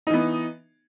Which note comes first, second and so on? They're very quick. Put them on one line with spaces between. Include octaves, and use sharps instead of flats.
D#4 E3 B3